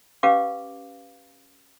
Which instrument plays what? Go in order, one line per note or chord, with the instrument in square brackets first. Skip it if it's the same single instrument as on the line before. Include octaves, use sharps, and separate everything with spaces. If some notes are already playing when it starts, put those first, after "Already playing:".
[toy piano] C#4 G4 B4 F5 D6